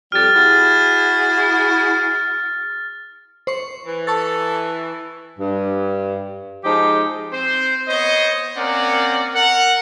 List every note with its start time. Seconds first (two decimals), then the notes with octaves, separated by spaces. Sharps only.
0.12 F2 G3 G4 F6 A6
0.35 E4 F#4 G#4
3.47 C5 C#6
3.85 E3
4.07 A4 A5 C#6 A6
5.39 G2
6.64 F3 G#3 D#4 G4 C5
7.32 C4 C5
7.88 B3 C5 C#5 D#5
8.57 A#3 C4 C#4 A#4 D5 F#5
9.35 A#4 F#5